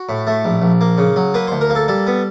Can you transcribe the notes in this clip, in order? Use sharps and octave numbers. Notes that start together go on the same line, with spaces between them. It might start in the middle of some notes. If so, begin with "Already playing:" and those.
Already playing: F#4
A2
A3
A#1
A#1
A#3
C#3
F#3
A#3 B4
C5
D2
A#4
A#3
A4
G3 A4
B3